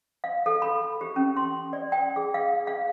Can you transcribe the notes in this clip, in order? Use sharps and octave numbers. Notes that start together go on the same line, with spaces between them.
F5
A4
B5
G4
C#4
C6
D5
G5
G#4
F5
F5